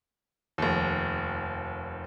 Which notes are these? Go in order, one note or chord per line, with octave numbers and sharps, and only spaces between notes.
F1 D#2